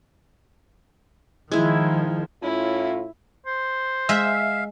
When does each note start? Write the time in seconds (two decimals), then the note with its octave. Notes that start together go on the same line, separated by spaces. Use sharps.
1.52 D#3 F3 G#3 E4
2.43 A2 C#4 E4 F4
3.47 C5
4.09 G#3 E5 F5